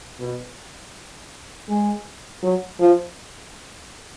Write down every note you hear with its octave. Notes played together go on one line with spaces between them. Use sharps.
B2
G#3
F#3
F3